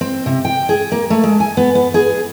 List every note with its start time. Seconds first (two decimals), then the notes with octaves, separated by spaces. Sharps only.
0.01 C4
0.26 C3
0.45 G5
0.69 G#4
0.92 A#3
1.10 A3
1.24 G#3
1.40 G#5
1.57 B3
1.75 B3
1.94 G#4